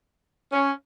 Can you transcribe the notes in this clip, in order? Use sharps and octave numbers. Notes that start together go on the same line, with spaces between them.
C#4